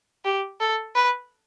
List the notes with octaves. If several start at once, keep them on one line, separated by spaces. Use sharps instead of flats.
G4
A4
B4